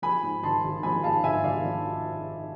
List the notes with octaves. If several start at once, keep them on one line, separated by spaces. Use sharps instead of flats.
F3 G#5 B5
G#2
G#1 A5 C6
G#1
F3 G#5 B5
G#2 F5 A5
G#1 E5 G#5
G#1 D5 F5
F3